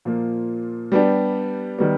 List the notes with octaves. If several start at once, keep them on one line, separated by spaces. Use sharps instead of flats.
A#2 F3 A#3
G3 B3 D4 G4
D#3 G3 B3